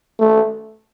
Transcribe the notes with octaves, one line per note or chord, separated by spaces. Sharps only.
A3